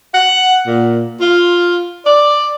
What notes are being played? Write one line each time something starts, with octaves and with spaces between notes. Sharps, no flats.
F#5
A#2
F4
D5